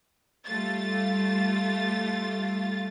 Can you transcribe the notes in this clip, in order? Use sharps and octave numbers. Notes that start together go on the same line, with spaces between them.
G3 A3 F4 A6